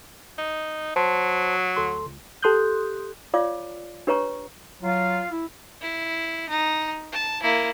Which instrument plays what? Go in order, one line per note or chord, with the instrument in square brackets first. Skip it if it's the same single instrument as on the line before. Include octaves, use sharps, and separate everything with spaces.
[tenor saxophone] D#4
[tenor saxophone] F#3 [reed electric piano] C5 A5 C6
[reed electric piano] D2 A4 C6
C#2
[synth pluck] G4 A4 C6 D#6 F#6 G6
[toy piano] F4 C#5 D5 F5 D6
D4 G4 B4 C#5 A#5 C#6
[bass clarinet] F#3 [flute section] F4
[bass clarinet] E4
[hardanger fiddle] E4
D#4
A5
A#3 E4